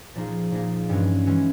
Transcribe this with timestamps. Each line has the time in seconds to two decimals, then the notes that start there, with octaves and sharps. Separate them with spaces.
0.15 A#2 F3 A#3 D#4 G#4
0.52 A#2 F3 A#3 D#4 G#4
0.89 G2 E3 G#3 C#4 F#4
1.26 E3 G#3 C#4 F#4